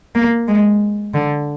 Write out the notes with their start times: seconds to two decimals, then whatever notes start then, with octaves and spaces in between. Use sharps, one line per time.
0.15 A#3
0.48 G#3
1.14 D3